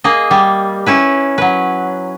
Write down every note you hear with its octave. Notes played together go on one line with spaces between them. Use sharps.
A#3 G#4 D#5
G3
C#4 E4 B4
F#3 B4